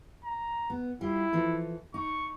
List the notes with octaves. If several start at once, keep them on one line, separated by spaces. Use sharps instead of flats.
A#5
B3
G3 E4 F4
E3 F3 A4
D#4 C#6